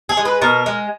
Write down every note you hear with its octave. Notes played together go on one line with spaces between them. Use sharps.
G#4
G#3
B4
B2 A#4
G#3